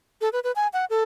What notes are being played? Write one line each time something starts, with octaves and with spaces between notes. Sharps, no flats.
A4
B4
B4
G#5
F#5
A4